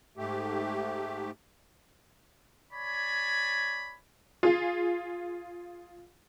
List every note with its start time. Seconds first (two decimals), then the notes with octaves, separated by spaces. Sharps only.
0.17 G#2 A3 G4
2.72 C#5 D5 G#5 B5
4.43 F4 G#4